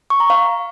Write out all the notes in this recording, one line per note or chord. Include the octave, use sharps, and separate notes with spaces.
C#6
A#5
F5